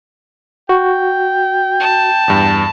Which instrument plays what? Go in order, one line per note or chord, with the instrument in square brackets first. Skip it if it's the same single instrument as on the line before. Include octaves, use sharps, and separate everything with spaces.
[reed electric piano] F#4 [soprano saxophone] G5
[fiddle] A5
[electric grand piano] E2 G2